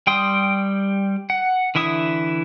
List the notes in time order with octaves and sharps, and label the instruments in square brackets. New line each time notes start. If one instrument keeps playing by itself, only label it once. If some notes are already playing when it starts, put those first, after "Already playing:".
[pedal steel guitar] G3 G5 C6 D#6
F#5
D3 E3 E4 E5 D#6